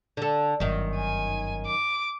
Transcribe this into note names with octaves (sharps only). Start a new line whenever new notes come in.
D3 A4
G1 F#2 D#3
G#5
D6